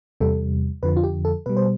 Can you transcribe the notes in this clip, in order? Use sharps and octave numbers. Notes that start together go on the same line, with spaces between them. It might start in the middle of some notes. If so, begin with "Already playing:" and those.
E2 C3 G3 A4
F2 D3 F3 B4
F4
G4
A4
B2 G3 B4
C5